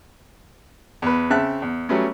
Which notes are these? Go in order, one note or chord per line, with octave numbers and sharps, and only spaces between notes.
E2 B4
C#3 C4 E5 A5 F#6
E2
F#3 G3 A3 B3 C#4